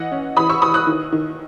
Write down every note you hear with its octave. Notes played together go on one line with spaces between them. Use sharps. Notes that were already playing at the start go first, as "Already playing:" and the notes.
Already playing: E3 D#5 F#5
C#4
E3 B5 D#6
C#6 E6
E3 B5 D#6
D#6 F#6
D#3
D#3